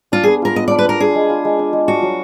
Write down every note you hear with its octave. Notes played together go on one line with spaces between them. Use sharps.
D4 F4
B3 G#4
F4 A#4
B3 D#5
D4 D5
B4
B3 A#4
D4 G#4
G#3
F4
G#3
D4
G#3
D4 F#4
F#3